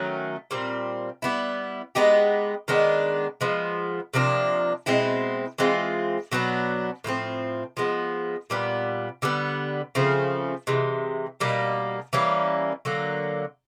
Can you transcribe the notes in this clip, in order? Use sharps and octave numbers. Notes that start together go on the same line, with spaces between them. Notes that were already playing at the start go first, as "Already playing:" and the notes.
Already playing: D#3 F#3 A3 C#4
A#2 G3 C4
G3 B3 E4
G#3 B3 D#4 G4
D#3 G#3 B3 D4
F3 G#3 B3
C3 F3 A#3 D4
B2 G#3 C4 E4
E3 G#3 C4 F4
B2 F#3 B3 D4
A2 F3 A3 C4
F3 G#3 B3
A#2 G3 B3
D3 G3 B3
C#3 F3 A3 C4
C3 E3 G#3
B2 G3 A#3 D#4
E3 G3 A#3 C#4
D3 F#3 A#3